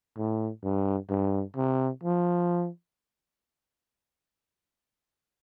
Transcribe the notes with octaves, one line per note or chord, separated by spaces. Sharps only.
A2
G2
G2
C3
F3